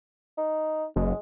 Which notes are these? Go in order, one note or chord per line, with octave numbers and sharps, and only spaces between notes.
D#4
F#1 G#3